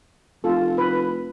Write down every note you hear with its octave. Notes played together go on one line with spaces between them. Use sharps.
F1 F4 A4
B4